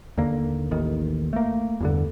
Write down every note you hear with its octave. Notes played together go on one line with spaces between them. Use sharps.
D#2 D3 A#3
A1 D#2 D#3
A3 A#3
E2 G2 D3